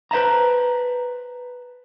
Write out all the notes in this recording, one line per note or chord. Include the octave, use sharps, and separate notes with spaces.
B4 C5 E5 A5 A#5